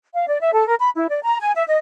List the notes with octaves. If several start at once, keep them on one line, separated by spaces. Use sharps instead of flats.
F5
D5
E5
A4
A#4
B5
E4
D5
A#5
G#5
E5
D#5